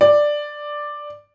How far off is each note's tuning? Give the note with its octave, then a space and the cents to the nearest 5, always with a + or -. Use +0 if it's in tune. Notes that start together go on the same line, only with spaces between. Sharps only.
D5 +5